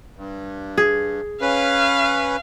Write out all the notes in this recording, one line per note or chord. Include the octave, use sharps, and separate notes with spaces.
G2
G#4
C#4 B4 F5